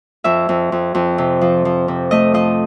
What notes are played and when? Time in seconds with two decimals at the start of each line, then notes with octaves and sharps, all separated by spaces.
0.24 F2 E5
0.49 F2
0.72 F2
0.95 F2
1.18 C3
1.41 F3
1.65 F3
1.88 C3
2.11 A3 D#5
2.34 F3 D#5